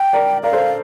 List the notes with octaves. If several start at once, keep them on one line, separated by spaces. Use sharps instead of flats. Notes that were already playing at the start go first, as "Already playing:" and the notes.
Already playing: G5
A#4 D5
A#4 D5 F5
A4 C5